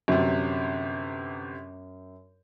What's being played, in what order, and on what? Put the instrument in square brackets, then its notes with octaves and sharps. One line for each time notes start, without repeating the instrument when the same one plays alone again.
[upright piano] G1 C3 [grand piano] F#2